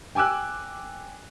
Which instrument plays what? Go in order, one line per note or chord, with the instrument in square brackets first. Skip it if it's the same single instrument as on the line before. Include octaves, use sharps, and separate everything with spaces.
[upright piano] G5 G#5 D6 E6 F#6